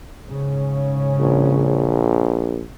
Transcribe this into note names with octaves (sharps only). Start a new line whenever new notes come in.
G#2 C#3 C#4
A#1